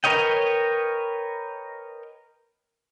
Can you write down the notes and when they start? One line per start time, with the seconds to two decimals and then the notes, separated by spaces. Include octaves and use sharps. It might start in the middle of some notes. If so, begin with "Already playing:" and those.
0.04 A#4 B4 C#5 D#5 G5